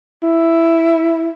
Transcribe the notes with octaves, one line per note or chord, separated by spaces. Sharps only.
E4